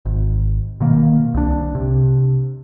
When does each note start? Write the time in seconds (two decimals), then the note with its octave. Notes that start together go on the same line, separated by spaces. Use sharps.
0.05 G#1
0.80 B2 D#3 A#3
1.34 C2 D4
1.75 C3